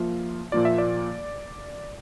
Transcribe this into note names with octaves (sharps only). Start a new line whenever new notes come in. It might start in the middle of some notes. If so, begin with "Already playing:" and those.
Already playing: F3 A#3 F4 E5
A#2 F3 A#3 F4 D5
E5
D5